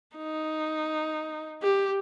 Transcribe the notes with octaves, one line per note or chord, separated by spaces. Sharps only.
D#4
G4